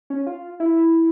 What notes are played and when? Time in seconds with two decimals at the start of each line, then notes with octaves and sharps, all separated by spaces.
0.10 C#4
0.27 F4
0.60 E4